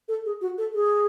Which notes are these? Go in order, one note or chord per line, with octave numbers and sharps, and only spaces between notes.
A4
G#4
F#4
A4
G#4